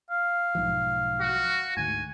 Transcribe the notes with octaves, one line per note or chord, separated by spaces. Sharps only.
F5
B1 G#2 F3
F#4
D2 G#2 G#5